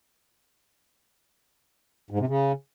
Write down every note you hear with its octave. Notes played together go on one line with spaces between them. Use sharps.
G#2
C3
C#3